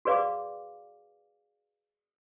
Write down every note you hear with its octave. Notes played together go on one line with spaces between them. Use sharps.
F#4 G#4 B4 D5 F5 D6